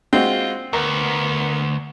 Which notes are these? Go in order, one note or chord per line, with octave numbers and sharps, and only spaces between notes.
G#3 C4 F4 F#4
D2 B3 A#4